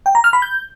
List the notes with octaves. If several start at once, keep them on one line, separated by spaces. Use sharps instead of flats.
G5
A#5
F6
B5
G6